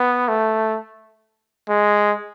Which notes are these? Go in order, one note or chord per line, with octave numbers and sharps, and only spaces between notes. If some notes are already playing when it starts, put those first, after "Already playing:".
Already playing: B3
A3
G#3